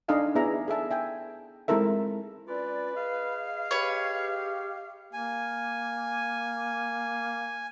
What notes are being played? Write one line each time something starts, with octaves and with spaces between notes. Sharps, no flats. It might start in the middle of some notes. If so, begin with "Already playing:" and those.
D4 D#4 A4 D#5 F5 G#5
B3 E4 G#4 D5 E5 A#5
G#4 A4 E5 A5
E5 G5 G#5
G#3 C4 E4 A4 A#4 E5
C#4 F4 B4 D5
G#4 D#5 F5
G4 B4 C#5
A#3 G#5